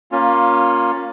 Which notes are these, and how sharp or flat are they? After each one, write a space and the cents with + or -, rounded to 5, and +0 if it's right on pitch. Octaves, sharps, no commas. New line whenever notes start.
A#3 +0 C#4 +0 F4 +15